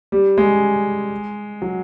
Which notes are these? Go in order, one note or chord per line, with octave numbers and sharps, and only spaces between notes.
G3
G#3
F#3